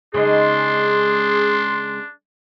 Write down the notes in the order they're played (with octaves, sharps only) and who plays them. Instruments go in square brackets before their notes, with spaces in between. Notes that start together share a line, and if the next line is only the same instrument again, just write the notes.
[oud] C#3 G#3 D#4 [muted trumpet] D4 [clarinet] G#4 [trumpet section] C6